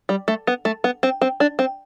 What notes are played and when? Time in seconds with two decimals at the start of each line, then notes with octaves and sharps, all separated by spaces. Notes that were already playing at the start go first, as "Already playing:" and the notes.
0.09 G3
0.28 A3
0.47 B3
0.65 A3
0.84 B3
1.03 C4
1.22 C4
1.40 D4
1.59 C4